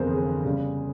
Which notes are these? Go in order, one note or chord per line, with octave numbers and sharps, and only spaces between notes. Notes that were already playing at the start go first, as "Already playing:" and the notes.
Already playing: G1 F2 C3 E3 G#4 A#4 C5
G#4
C#3 G3